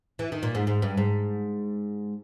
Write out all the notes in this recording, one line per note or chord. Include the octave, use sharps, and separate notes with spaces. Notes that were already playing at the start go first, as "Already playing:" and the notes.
E3
D#3
A#2
G#2
G#2
G2
G#2